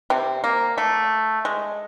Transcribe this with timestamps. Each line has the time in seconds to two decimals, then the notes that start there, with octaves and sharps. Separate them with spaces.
0.10 C3 C4
0.44 A#3
0.78 A3
1.45 G#3